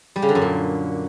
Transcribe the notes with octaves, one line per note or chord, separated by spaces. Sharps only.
G3
C#3
D3
F#2
A#2